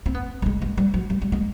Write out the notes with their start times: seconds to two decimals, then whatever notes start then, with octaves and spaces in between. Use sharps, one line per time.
0.06 C4
0.15 B3
0.42 G3
0.46 G#3
0.62 G#3
0.78 G3
0.94 F#3
1.10 G3
1.22 G3
1.32 G#3